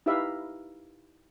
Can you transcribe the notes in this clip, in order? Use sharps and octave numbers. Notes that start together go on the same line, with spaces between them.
D#4 E4 G4 B4 E5 F5